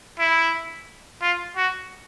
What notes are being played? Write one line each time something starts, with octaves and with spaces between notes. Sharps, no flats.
E4
F4
F#4